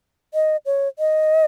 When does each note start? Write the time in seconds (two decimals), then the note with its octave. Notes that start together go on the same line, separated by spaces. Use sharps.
0.34 D#5
0.66 C#5
0.99 D#5